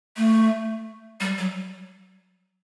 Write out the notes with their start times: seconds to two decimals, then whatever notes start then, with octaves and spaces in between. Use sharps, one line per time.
0.17 A3
1.20 G3
1.38 F#3